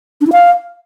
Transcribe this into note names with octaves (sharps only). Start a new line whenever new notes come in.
D4
E4
F5